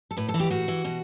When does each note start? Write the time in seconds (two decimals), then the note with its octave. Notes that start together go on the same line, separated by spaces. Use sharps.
0.11 A4
0.17 A2 B4
0.29 A4
0.34 E3
0.40 G4
0.50 A2 F#4
0.68 E3
0.85 B2